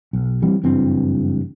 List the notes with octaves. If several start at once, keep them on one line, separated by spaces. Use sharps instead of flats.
B1
E3 G3 C4
F#1 G2 E3 C4